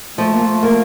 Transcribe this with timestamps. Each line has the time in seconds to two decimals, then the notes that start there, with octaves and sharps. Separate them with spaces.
0.18 F3 A3
0.32 A#3
0.45 A3
0.63 A#3